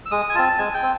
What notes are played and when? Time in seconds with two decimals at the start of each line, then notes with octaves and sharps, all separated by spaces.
0.06 E6
0.11 G#3 D#6
0.29 G#5
0.35 C4 F4 A5
0.58 G#3 G#5
0.74 G5
0.82 C4